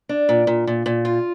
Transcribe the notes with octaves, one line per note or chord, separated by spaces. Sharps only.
D4
A#2
A#2
A#2
A#2
F4